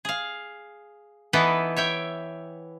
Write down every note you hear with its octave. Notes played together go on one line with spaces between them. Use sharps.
G#4 F5
E3 B3 D#4 E4 A4 B4
C#5 E5 G5